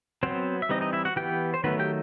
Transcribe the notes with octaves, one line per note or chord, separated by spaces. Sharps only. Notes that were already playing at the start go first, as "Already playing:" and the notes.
F#3 B3 C4 C5
E5
E3 G3 C4 D#4 D#5
D#4 D#5
E4 E5
F#4 F#5
E3 B3 G4 G5
C5
D#3 F#3 A3 B3 B4
G4 G5